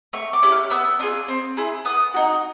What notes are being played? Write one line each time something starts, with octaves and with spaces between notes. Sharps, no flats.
A3 C#6
D6
C#4 E4 G4
F6
B3 E6
D4 F4 G#4
C4
E4 G#4
B3 D#6
D#4 F#4